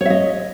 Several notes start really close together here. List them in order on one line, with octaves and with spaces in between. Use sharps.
C#5 E5 D#5